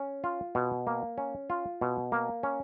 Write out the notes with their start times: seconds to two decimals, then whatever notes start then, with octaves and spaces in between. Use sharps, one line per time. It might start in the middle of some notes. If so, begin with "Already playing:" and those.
Already playing: C#4
0.24 F4
0.55 B2
0.87 A#3
1.18 C#4
1.50 F4
1.81 B2
2.12 A#3
2.43 C#4